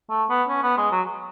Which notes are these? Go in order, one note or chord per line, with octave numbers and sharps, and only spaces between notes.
A3
B3
C#4
B3
G#3
F#3